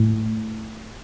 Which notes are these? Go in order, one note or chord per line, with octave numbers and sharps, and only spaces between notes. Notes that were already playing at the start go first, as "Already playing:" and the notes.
Already playing: A2